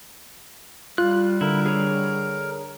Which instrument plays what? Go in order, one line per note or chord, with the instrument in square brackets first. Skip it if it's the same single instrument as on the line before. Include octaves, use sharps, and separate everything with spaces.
[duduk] G3 [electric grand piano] F4 [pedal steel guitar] F#6
[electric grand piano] D3 [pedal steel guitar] E4 [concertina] A#4
[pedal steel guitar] G#4 C#5